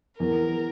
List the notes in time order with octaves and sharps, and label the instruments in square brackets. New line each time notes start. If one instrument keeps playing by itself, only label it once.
[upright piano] E2 [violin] A#4